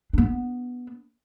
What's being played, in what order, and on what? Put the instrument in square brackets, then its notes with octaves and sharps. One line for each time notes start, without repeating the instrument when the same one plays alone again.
[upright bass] B3 D4